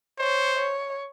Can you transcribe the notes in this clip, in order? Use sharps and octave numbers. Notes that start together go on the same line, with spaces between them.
C5 C#5
C#5